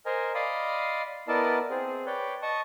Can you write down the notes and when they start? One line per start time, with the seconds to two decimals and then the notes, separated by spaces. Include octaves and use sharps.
0.06 A#4 C5 D#5 G#5 A#5
0.34 D5 D#5 F5 B5 C6 D#6
1.28 B3 E4 A#4 D5 D#5 A5
1.70 C4 G#4
2.06 B4 C#5 D5 G5
2.42 D#5 A5 C#6 D#6